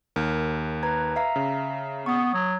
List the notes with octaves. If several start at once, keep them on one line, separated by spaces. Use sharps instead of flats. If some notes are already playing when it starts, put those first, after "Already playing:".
D#2 A#4
B4 A#5 G#6
E5 F5 A#5
C#3
B3 C#6 D#6
F#3